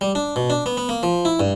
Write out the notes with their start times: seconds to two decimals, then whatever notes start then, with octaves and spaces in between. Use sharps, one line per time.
0.01 G3
0.15 D4
0.36 B2
0.50 D4
0.66 B3
0.77 B3
0.89 A#3
1.03 F3
1.25 E4
1.40 G2